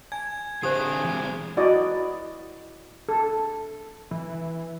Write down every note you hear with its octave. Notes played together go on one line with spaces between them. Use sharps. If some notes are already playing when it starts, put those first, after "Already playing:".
G#5 G#6
D3 C4 F4 G4 G#4 C5 D#6
E3 G#3
E4 F#4 D5 D#5
A4
E3